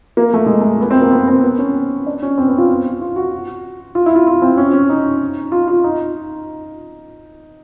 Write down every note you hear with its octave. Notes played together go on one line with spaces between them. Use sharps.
A#3
A3
G#3
A3
B3
C4
A#3
B3
C4
B3
C#4
D4
C#4
C4
B3
F4
F4
F4
F#4
F4
E4
F4
F4
C4
C#4
C#4
D#4
F4
F4
D#4